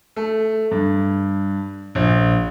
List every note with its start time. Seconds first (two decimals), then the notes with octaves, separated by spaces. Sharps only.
0.16 A3
0.71 G2
1.95 A#1